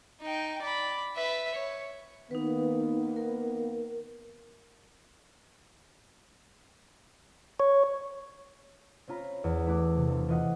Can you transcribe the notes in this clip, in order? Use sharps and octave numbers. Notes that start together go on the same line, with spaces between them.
D#4 G5
D5 B5
B4 E5
C#5
D#3 A#3 B3 D#4 B4
A#4
C#5
C4 C#4 F4 A#5 B5
E2
A3 E4 D6 F#6
C3
E1
E3 F4 D#5 F#5